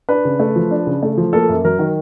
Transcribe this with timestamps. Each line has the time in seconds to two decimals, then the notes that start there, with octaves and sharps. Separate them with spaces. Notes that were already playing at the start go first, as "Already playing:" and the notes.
0.09 D4 B4
0.25 C#3
0.40 A3
0.56 F3
0.71 D4
0.87 C#3
1.03 A3
1.17 F3
1.33 A#3 A4
1.49 F#2
1.65 F#3 A#4
1.79 D#3